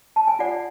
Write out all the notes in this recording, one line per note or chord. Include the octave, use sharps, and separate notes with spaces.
A5
G#5
F4 D5 F#5